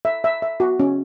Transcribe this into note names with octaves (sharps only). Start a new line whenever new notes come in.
E5
E5
E5
F#4
C#4